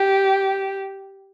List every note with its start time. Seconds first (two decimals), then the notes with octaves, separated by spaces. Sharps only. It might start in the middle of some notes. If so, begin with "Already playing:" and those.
Already playing: G4